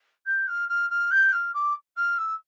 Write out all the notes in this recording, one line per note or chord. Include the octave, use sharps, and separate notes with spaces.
G6
F6
F6
F6
G6
F6
D6
F6
E6